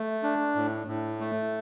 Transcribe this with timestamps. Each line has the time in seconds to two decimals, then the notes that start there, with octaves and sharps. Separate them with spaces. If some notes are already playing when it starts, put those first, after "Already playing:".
Already playing: A3
0.23 D4
0.55 A2
0.87 A2
1.20 A3